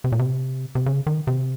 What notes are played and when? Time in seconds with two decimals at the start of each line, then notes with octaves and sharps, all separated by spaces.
0.04 C3
0.12 A#2
0.19 C3
0.75 C3
0.86 C#3
1.07 D#3
1.27 C3